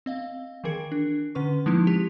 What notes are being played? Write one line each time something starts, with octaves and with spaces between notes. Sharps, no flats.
C4 D#5 F5
D#3 E3 G#4 A#4 G#6 C#7
D4
D3 C#4 B4 C#6
F3 G#3 A#3 C4 D#4 E4
G#3 G4